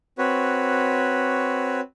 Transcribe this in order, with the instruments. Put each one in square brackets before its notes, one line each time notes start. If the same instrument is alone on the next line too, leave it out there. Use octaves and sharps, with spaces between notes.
[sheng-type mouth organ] C4 F#4 B4 C#5